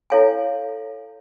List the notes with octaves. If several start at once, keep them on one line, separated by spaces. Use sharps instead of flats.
E4 A4 C#5 F5 G#5